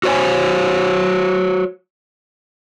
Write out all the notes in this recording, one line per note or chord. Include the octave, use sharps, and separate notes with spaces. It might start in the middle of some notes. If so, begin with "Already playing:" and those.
F#4 C5 C#5 G#5